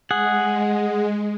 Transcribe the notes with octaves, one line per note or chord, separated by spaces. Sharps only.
G#3 G#4 F#5